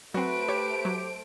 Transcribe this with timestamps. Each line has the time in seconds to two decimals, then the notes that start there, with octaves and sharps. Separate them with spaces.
0.14 F#3 A3 C4 F#4 B4 C5 D7
0.49 G4 C#5
0.85 F#3